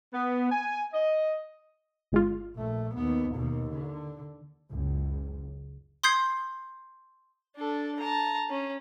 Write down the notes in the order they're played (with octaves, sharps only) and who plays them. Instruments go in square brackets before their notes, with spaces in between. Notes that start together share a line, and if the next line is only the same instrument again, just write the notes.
[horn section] B3
G#5
D#5
[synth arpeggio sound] G1 G#3 F4
[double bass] A#1 A3
D#2 B3
D#2 B2
D3
[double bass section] F#1 C#2
[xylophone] C6 D#6 G6 G#6 C7
[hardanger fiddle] D4 A4
A5 A#5
C#4